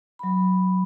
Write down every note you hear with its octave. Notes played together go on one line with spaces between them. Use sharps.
F#3 B5